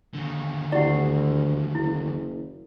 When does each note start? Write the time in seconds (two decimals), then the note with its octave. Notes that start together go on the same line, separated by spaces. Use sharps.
0.14 D#2 D3
0.72 D2 E4 G4 D5 F#5
1.75 F#1 E4